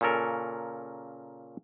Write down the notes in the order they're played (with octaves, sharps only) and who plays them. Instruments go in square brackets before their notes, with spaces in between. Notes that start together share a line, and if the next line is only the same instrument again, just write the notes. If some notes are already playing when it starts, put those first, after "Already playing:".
[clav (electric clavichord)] A#2 C#3 C#4 A4 A#4